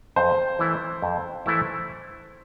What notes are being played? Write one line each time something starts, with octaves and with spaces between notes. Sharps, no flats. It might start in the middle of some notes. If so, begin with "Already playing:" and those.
F2 C5
E3 A3 E4
F2
E3 A3 E4